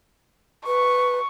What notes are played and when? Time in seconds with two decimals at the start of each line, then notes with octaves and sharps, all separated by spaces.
0.66 B4 C#6